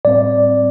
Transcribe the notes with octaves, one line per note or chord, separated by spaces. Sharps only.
A2 G3 C4 D5